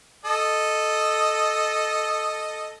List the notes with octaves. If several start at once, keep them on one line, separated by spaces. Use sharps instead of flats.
A4 D#5